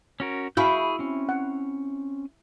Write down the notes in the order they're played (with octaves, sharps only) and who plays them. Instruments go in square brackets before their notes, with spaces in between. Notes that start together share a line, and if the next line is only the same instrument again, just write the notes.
[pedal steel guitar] C#4 F#4 A#4
[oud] E4 [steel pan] F#4 F5 G#5 [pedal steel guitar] G#4 C#6 G6
[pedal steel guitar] C4 C#4
[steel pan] F#5